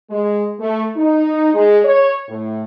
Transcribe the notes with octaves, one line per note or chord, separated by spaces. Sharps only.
G#3
A3
D#4
G#3
C#5
A2